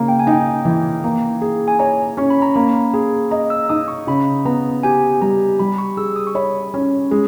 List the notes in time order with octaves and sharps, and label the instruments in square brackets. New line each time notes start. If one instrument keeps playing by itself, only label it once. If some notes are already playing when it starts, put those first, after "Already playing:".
Already playing: [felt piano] C#3 A#3
[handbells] G5
G#5
[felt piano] D#4 [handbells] G5
[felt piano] E3
A#3
G#4
[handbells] G#5
[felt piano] C#5 [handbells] A#5
[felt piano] C#4 [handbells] C#6
[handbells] B5
A#5
[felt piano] A#3 [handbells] B5
[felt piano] G#4
[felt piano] D#5 [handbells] A#5
[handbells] E6
[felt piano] D#4 [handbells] D#6
[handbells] C#6
[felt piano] C#3 [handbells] B5
[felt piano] B3 [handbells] A#5
[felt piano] G4 [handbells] G#5
[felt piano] G3 [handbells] A#5
[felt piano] G3 [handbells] B5
[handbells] C#6
[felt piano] G#4 [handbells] E6
[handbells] D#6
C#6
[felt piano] C#5 [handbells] B5
[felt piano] C#4
G#3